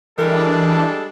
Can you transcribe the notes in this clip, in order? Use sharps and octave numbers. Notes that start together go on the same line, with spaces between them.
E3 G3 G#3 D4 A4 A#4